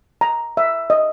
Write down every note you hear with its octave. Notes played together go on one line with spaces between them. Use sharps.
A#5
E5
D#5